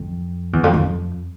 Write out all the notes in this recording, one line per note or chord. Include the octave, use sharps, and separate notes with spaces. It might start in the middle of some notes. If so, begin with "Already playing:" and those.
Already playing: F2
E2
F2
F2